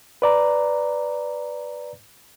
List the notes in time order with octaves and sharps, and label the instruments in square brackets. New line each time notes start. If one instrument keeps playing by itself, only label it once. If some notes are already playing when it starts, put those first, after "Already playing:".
[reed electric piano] B4 D5 A#5